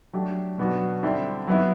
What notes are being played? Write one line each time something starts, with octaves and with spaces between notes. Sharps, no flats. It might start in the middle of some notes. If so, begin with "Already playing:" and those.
F#3 A3 D4 G4
B2 F#3 B3 D4 F#4
D3 G3 C4 E4
F#3 B3 E4